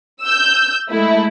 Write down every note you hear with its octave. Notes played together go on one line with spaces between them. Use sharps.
E6 G6
G#3 A3 E4